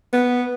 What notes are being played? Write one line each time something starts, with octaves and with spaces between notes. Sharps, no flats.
B3